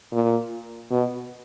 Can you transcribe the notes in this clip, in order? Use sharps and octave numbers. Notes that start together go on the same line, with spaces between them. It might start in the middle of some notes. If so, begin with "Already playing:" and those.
A#2
B2